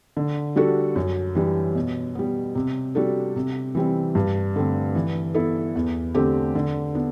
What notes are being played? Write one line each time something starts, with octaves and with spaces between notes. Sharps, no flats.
D3
G3 D4 F#4 A4
F#2
E3 G3 D4
B2
G3 B3
C3
G3 D4 F#4 A4
C3
E3 G3 C4
G2
D3 A3 C4
E3
B3 E4 A4
E2
D3 A3 C4 G4
D3
B3 D4